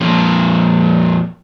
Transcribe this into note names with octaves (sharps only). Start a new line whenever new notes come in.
F2 A#2